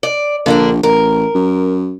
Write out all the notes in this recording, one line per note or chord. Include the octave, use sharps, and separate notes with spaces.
D5
A#1 D3 A#3 D4
A1 A#4
F#2